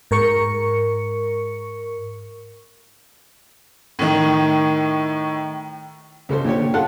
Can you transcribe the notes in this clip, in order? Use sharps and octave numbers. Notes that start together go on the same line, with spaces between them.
G#2 A#4 C#6 C#7
A2 D#3
C#2 C#3 A4 C5
A#2 D3 G4 C#5
F4 G#4 A4 F5 F#5 A5